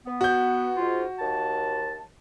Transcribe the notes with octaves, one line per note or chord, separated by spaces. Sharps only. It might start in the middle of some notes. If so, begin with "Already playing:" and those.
B3
F#4 G6
G#2 F4
D#2 A5